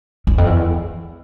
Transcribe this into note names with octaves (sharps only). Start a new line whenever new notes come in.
E2
F2
E2